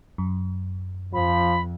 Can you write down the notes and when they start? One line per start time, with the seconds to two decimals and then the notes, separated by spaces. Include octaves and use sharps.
0.18 F#2
1.13 F2 F3 B5